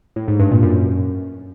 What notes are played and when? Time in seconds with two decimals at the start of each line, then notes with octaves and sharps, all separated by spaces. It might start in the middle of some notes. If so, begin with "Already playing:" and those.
0.16 A2
0.28 G#2
0.40 G2
0.51 A#2
0.63 F#2